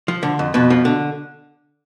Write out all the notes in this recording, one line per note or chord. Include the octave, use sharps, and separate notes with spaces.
F3
D3
F2
F2 B2 B3
F3
D3